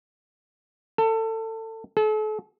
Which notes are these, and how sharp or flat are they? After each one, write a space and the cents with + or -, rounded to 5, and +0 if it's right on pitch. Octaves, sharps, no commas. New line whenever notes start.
A4 +25
A4 -40